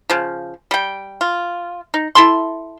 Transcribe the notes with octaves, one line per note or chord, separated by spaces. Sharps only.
C#3 F3
G3 G5
F4
D#4
E4 A4 C6